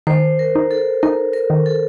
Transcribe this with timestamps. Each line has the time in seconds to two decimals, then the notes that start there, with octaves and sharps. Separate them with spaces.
0.07 D#3 C5
0.39 A#4
0.55 D#4
0.71 A4
1.03 D#4 A#4
1.33 A#4
1.50 D#3
1.66 A4